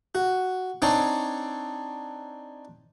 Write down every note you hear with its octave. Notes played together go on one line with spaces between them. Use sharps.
F#4
C4 D4 D#4 C#5 D5